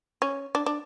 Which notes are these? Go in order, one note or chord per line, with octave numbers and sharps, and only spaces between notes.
C#4
D4
D4